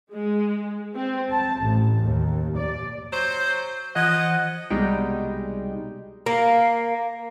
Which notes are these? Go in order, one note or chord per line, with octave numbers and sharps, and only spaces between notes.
G#3
C4
A5
A1
D#2
D5
F#3 C5
E3 F3 D#5 F#5 G#6
C2 B2 G3 G#3 D#4 G5
A#3